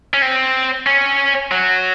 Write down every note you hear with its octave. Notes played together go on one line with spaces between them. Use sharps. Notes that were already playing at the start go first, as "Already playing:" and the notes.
C#4
C4
C#4
F#3